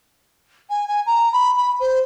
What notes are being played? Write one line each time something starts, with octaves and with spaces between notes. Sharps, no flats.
G#5
G#5
A#5
B5
B5
C5